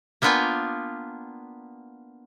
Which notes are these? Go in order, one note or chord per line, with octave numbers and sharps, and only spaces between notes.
A#3 B3 D4 F4 G5 G#5